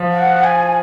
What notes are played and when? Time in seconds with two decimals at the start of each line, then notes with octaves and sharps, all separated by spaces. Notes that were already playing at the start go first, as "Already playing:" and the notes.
Already playing: F3
0.12 F#5
0.44 G#5